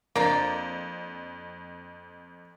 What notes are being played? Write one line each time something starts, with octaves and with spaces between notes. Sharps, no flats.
F2 A#3 D4 D5